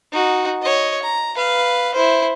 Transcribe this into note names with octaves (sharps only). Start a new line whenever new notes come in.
D#4 F#4
C#5 D#5
A#5
B4 F5
E4 C5